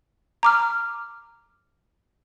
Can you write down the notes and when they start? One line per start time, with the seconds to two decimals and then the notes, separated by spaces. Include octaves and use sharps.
0.43 A#5 D6 F6